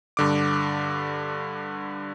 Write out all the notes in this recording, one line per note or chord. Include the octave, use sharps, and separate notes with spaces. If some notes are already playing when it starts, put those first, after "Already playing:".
G2 D3 D6